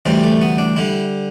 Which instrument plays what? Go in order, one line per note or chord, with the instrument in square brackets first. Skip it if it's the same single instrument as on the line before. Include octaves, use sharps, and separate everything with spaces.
[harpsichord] D2 C3 E3 G3 C4
A3
B3
D4
D3 G3 E4